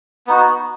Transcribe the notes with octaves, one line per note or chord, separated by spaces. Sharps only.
B3 D#4 F#4